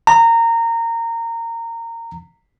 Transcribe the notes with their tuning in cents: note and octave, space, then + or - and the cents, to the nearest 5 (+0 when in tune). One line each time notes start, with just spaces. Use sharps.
A#5 -20